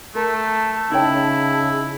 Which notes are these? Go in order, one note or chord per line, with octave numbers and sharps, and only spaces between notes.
A3 A#4 A5
C#3 D#4 E4 C#5 G5